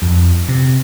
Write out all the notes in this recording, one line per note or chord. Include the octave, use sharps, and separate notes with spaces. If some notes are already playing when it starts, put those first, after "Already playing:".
F2
C3